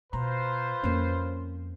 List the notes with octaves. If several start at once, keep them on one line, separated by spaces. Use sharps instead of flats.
B2 F4 B4 C5 A#5
F2 A#3 C4 C#4